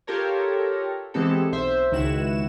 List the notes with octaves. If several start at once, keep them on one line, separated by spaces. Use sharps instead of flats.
F4 G4 A4 A#4 C#5
E3 G#3 B3 C4 G4 A4
B1 C5 E5
C#2 D#3 E4 F#4 E7